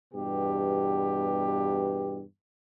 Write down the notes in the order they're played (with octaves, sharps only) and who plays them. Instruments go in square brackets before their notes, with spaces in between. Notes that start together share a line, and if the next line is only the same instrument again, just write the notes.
[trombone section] E2 G2 B2 B3 G4